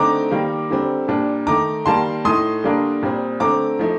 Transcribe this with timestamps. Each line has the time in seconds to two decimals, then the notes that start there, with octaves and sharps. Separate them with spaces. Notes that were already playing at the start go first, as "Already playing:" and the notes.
Already playing: D3 A3 C4 D#4 A#5 D6
0.31 D#3 G3 A#3
0.70 D3 G3 C4
1.08 A#2 G3 D4
1.47 D#3 A3 D#4 A#5 D6
1.86 D#3 G3 A#3 A5 C6
2.25 A2 A3 D#4 C6 D#6
2.64 D3 G3 A#3 D4
3.02 A#2 G3 C4
3.40 D3 A3 C4 A#5 D6
3.79 F3 A3 D#4